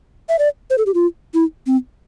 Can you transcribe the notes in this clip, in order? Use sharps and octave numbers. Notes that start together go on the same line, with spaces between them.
E5
D5
C5
A4
G4
F4
E4
C4